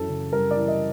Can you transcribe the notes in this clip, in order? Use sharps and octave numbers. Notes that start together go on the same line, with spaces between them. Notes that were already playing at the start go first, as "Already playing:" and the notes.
Already playing: F#2 E3 A4
C#3
G3 A#4
D5
E3
D#5